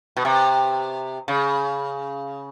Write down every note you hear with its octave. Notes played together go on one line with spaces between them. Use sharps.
B2
C3
C#3